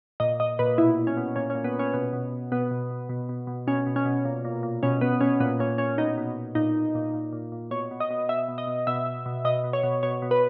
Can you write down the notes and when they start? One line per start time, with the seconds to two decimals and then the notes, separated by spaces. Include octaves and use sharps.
0.20 A#2 D#5
0.40 A#2 D#5
0.59 A#2 B4
0.78 B2 E4
0.97 B2
1.07 C#4
1.17 B2
1.36 A#2 C#4
1.50 C#4
1.55 A#2
1.64 B3
1.74 A#2
1.79 C#4
1.94 B2 B3
2.13 B2
2.32 B2
2.52 B2 B3
2.71 B2
2.90 B2
3.09 B2
3.29 B2
3.47 B2
3.67 B2 C#4
3.86 B2
3.96 C#4
4.05 B2
4.25 A#2
4.45 A#2
4.63 A#2
4.83 B2 C#4
5.01 B2 B3
5.21 B2 C#4
5.40 A#2 B3
5.59 A#2 C#4
5.78 A#2 C#4
5.98 B2 D#4
6.18 B2
6.36 B2
6.55 A#2 D#4
6.75 A#2
6.95 A#2
7.14 A#2
7.33 A#2
7.52 A#2
7.71 B2 C#5
7.91 B2
8.00 D#5
8.10 B2
8.29 B2 E5
8.48 B2
8.58 D#5
8.67 B2
8.87 B2 E5
9.06 B2
9.26 B2
9.45 B2 D#5
9.64 B2
9.73 C#5
9.83 B2
10.03 B2 C#5
10.22 B2
10.31 B4